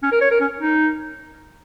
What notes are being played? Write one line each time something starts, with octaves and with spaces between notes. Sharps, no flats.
C#4
A#4
C#5
A#4
C#4
D#4